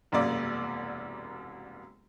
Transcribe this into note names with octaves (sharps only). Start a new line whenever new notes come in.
E1 C2 F#2 A#3 D5